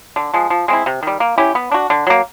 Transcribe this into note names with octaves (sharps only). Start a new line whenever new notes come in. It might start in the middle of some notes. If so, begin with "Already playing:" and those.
D3
F3 G#3
F3
G#3 C4 E4
C3
D#3 G3
A#3
C#4 E4 G4
B3
D4 F#4
D3
F#3 A#3